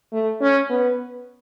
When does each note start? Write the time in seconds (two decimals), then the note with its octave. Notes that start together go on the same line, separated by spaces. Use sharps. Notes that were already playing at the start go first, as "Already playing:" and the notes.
0.12 A3
0.41 C#4
0.70 B3